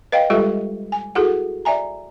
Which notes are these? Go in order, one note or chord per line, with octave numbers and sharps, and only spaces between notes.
B4 D#5 F5 G5
G3 G#3 F4 G4 A4 E5
G#5
E4 F#4 G#4 A4 F#5
D5 E5 G#5 A#5